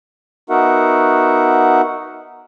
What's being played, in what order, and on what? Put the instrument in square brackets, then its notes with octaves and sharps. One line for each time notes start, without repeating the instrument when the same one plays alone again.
[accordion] B3 D#4 F#4 A#4 E5 F#5